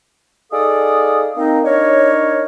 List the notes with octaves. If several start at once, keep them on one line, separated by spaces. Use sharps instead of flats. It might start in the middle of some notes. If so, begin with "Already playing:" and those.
D#4 G#4 A4 D5 F5 D#6
A#3 C4 D#4
D4 D#4 A#4 C#5